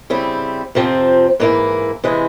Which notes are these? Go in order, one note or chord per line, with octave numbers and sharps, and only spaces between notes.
C#3 G3 C4 E4
F2 C3 F3 C4
G#2 E3 A#3 E4
C3 E3 G#3 E4